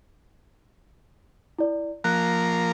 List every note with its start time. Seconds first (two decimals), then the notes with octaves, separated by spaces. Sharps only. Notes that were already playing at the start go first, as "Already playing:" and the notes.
1.59 E4 D5
2.04 F3 A#3 A#4 F#6